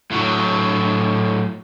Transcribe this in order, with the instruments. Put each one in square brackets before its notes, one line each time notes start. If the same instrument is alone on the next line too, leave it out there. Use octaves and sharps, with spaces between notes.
[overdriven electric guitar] A2 F#3